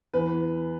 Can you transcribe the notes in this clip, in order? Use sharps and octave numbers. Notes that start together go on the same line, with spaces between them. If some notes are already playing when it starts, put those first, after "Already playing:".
E2 B4